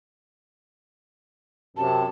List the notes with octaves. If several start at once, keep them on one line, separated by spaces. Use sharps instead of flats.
F#2 C3 A5